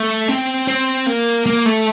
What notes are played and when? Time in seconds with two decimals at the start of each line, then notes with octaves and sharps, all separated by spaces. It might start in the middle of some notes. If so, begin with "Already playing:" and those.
Already playing: A3
0.29 C4
0.68 C4
1.06 A#3
1.46 A#3
1.66 A3